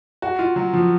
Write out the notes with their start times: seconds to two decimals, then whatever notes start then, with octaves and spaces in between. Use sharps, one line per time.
0.22 F#4
0.39 F4
0.56 F#3
0.73 F3